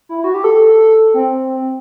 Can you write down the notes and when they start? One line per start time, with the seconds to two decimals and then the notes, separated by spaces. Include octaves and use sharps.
0.09 E4
0.24 F#4
0.34 G4
0.44 A4
1.14 C4